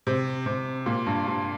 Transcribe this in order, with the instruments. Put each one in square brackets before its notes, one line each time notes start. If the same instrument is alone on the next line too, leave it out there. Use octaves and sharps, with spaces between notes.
[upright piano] C3
C3
A#2
G2
G2